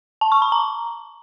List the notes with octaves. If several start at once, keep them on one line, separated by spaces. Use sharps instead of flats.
A5
C#6
B5
A#5